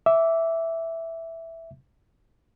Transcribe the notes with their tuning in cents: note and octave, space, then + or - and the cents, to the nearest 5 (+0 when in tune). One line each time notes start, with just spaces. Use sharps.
E5 +0 D6 -15